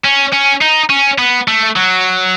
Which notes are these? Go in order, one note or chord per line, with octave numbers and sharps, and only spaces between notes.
C#4
C#4
D#4
C#4
B3
A3
F#3